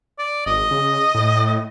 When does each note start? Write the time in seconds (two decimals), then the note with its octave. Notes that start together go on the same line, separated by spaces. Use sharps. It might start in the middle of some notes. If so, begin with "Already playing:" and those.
0.19 D5
0.46 G#1 D#5
0.71 C#3
1.15 A2